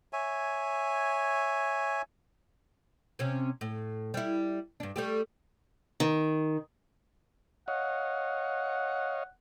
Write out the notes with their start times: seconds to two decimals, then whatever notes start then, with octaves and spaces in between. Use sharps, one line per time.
0.13 C#5 E5 G#5
3.19 C3 C#4
3.61 A2
4.14 G3 E4
4.80 G2 D4
4.96 G3 A3 G4
6.00 D#3
7.68 C#5 D#5 F5 F#5